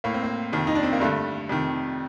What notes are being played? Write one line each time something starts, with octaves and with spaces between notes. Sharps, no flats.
A2 A#3
C4
A#3
F2 C3 D#3
D#4
D4
C4
A#3
G2 D3 A3
F2 C3 D#3